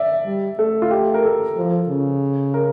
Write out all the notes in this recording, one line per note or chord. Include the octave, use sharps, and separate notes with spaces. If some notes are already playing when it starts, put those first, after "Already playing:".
Already playing: D5 E5
G3
A3 A4
F4
G4
A#4
A4
F3
C#3
A#4